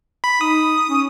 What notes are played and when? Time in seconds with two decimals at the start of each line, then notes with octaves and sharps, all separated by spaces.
0.24 B5
0.41 D#4 D#6
0.89 C#4